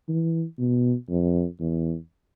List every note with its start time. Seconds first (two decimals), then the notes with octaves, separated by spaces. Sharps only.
0.09 E3
0.59 B2
1.10 F2
1.60 E2